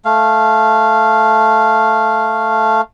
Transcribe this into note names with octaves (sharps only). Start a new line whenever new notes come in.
A3 F5